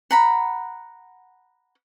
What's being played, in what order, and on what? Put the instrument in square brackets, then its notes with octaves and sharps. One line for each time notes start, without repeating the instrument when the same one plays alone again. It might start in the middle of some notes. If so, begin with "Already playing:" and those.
[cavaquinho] F#5 A#5 B5